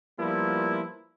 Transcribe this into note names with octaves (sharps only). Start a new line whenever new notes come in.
F3 G3 A#3 B3 E4 F4